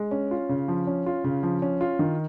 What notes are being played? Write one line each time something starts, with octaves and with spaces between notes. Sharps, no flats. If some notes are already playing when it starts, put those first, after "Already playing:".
Already playing: G#3
C#4
F4
C#3
F3
C#4
F4
C#3
F3
C#4
F4
D#3